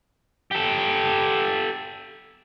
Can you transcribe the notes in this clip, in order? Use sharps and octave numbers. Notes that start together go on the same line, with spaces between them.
G4 A4